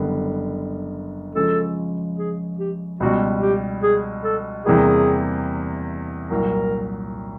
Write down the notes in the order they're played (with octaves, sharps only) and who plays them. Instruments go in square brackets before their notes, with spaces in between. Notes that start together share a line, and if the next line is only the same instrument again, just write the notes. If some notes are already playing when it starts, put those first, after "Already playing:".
Already playing: [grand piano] F#1 F#2 D3 G3 B3
[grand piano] C#3 F3 G#3 C#4 [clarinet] A4
[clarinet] G#4
G4
[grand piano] C#2 B2 G3 [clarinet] F#4
[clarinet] G4
G#4
A4
[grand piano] E2 C3 E3 G3 A#3 [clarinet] G#4
[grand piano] C2 A#2 F#3 [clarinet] A#4